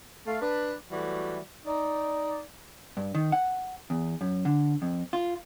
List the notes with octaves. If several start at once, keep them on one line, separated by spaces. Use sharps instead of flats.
A3 F5
D4 B4
E3 F#3 G3 A3 F#4
D#4 D5
G2
D#3
F#5
E2
F#2
D3
F2
F4